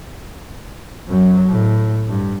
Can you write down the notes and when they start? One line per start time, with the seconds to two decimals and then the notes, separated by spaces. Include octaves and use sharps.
1.08 F#2 F#3
1.49 A2
2.09 G2